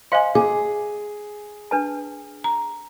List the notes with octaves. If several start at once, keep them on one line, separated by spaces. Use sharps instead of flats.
C5 D#5 F5 G#5 C6
G#4 D6
D4 B4 A5
A#5